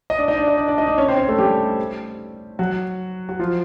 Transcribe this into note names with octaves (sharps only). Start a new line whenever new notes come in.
D#5
D4 D5
D#4 D#5
D4 D5
D#4 D#5
D4 D5
D4 D5
D#4 D#5
D4 D5
C#4 C#5
C4 C5
C#4 C#5
A3 A4
G3 G4
F#3 F#4
F#4
F3 F4